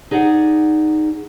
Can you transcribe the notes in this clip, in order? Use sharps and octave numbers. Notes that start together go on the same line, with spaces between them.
D#4 G#4 D5 F#5